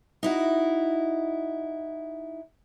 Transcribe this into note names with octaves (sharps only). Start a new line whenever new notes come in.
D#4 E4 F#4